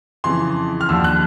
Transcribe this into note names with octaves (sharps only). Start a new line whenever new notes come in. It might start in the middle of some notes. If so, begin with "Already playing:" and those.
F2 C#3 E3 C6
F6
D#2 D3 F3 E6
F#6